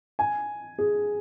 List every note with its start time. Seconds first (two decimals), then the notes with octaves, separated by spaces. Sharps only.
0.19 G#5
0.78 G#4